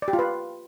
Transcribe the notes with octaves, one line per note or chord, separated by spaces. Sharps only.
D5
G4
F4
B4